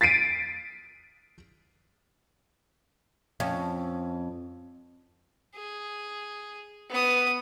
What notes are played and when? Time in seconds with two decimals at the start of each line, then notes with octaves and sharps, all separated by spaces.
0.01 A6 B6 C7 D7 D#7
3.40 F2 C#4
5.55 G#4
6.90 B3 D#6